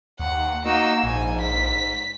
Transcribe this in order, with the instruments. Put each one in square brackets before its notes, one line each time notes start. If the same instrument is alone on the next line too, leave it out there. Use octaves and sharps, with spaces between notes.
[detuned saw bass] D#2 [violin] F#5
[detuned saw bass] A#3 [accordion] D#4 F#4 D#5 [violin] E6
[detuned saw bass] A#1 [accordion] G#2 [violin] G#5
[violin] B6